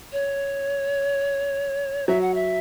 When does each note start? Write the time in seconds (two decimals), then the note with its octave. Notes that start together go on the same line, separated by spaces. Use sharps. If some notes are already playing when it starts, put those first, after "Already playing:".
0.13 C#5
2.08 F#3 E5
2.21 F#5
2.35 E5